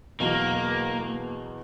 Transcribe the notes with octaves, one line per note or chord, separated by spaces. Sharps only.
E2 B2 F#3 A#3